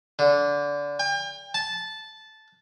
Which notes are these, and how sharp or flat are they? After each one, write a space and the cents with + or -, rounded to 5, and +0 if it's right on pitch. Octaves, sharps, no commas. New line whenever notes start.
D3 -20
G5 +40
A5 -10